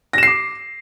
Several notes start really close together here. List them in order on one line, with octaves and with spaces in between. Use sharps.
A#6 E7 C7 D6